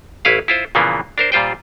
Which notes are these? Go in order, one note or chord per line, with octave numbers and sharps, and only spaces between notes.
A1 C#4 E4 B4 F5
E4 F4 C5
A#2 C#3 E3 F3 A#3 B3
D4 A#4 C5
A#2 G3 F4 C5 G5